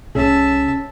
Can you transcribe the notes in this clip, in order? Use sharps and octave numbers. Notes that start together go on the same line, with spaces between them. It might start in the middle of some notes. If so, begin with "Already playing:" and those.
C2 C#4 G#4 E5 A5